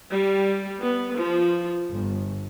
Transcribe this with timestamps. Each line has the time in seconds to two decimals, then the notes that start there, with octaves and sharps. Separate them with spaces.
0.11 G3
0.80 B3
1.17 F3
1.92 G1